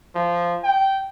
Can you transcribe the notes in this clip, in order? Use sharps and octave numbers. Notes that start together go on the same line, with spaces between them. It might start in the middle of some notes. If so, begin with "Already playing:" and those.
F3
G5